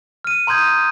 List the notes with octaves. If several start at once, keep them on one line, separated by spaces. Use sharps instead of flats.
F6 D#7
A#5 C6 D#6 G6 G#6 D#7